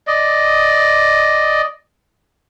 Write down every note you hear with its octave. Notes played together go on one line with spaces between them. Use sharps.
D5 D#5